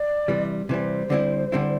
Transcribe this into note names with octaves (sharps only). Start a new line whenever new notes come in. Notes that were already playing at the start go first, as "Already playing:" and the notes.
Already playing: D5
C3 E3 G3
C3 E3 G3 C5
D3 G3 C4 E4
D3 G3 C4 E4